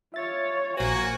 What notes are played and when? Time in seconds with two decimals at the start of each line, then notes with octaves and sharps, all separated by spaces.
0.14 F4 C#5 E5 A6
0.77 A#1 A#3 F#4 C5 G#5